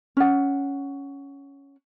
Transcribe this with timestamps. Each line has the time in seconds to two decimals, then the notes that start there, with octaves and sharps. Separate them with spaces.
0.17 C#4 F#5